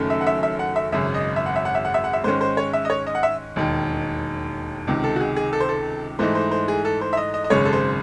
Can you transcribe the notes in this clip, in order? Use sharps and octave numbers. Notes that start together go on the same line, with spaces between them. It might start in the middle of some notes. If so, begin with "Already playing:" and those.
Already playing: F#1 F#2 D#3 A3 C#4
E5
F#5
E5
E5
F#5
E5
G#1 F#2 C#3 E5
D#5
E5
F#5
E5
F#5
E5
F#5
E5
F#5
E5
G#2 D#3 G#3 C#4 C5
C5
C#5
E5
D#5
C#5
D#5
F#5
E5
E1 D#2 D#3
C#2 C3 D#3
A4
F#4
G#4
G#4
A4
C5
A4
G#2 E3 A3 D#4 C5
C5
C5
G#4
A4
C5
E5
D#5
D#5
D#5
G#1 F#2 C#3 G#3 C#5
A4
C5